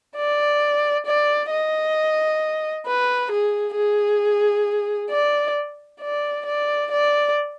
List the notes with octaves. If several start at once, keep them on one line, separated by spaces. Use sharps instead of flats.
D5
D5
D#5
B4
G#4
G#4
D5
D5
D5
D5